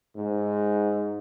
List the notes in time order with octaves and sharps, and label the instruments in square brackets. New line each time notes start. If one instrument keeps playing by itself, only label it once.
[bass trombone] G#2